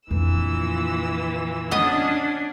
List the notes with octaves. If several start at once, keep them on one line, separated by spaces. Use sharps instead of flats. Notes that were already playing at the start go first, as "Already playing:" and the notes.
F2 A#2 D3 E3 E6
B3 C#4 D4 D#5